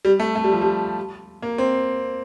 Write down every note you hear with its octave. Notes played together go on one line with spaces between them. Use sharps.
G3
A3
A3
G3
F3
G3
A#3
C4